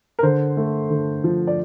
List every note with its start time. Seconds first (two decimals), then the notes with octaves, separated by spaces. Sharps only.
0.19 A#4
0.23 D3 C5
0.57 A3
0.90 D3
1.24 F3
1.47 D5